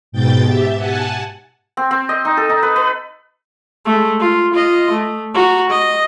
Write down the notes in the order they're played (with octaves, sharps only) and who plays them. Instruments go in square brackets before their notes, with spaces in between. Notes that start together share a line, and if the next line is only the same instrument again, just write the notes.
[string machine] G#2 B2 G5 G6 A6
G4 E5
F#5 G#5 A5
[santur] C4
C4
D#5
D#4
A4
D#4
B4
B4
[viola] G#3 A3
F4
F4 D#5
A3
F#4 A#5
D#5